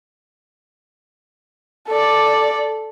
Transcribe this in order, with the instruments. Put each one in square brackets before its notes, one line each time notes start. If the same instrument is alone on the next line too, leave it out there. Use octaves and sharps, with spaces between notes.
[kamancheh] A4 D5